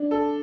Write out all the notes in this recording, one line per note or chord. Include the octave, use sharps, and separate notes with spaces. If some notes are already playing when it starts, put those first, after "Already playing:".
Already playing: D4
A4